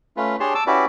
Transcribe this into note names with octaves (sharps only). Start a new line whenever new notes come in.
A3 C#4 F4 B4
D4 G4 G#4 C#5 A5 C6
A5 D6 E6
C#4 E4 F#4 G4 B4 D5